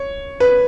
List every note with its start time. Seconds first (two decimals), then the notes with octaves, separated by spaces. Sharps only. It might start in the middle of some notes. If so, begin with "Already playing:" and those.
Already playing: C#5
0.40 B4